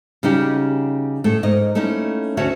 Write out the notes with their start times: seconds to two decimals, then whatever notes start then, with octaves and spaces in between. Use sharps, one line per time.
0.23 C#3 G3 C#4 D#4 F#4 G4
1.24 A2 A3
1.43 G#2 A#4 D#5
1.75 A3 A#3 C#4 D#4 E4
2.37 D2 C#4 F#4 C#5 E5 A5